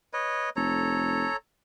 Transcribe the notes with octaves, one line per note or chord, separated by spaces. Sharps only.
B4 C#5 D#5
F1 A4 C#5 A#5